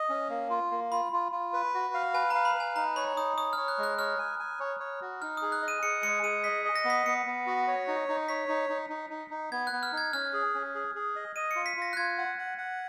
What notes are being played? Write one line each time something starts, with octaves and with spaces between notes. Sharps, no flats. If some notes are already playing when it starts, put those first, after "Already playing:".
Already playing: D#5
C#4
A#3
F4
A#3
F4 B5
F4
F4
B4
F#4
F5
B4 G#5
F5 A#5
B5
B4
G#5
D#4 A#5
C#5 B5
D#4 D#6
C#5 D#6
C#5 F6
F#6
G#3
F#6
C#5 F6
G#5
G#5
C#5
C#5
F#4
D#4 F6
G#4 D#6
F#6
D#5
D#7
G#4 C#7
G#3 C#7
G#4 D#7
D#5 B6
D#5
A#6
B3
B6
B3 C#7
B3
F#4
C#5
D#4
D#4
C#5 B6
D#4
D#4
D#4
D#4
D#4
B3 G#6
F#6
B3
F6
D#4
G#6
C#4 F6
G#4
C#4
G#4
G#4
D#5
D#5 D#7
F4 C#7
B6
F4 A#6
F#6
F4 G#6
F#5
F#5
F#5